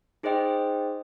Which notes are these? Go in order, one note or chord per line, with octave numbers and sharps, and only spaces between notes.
D#4 G#4 C5 D#5 G5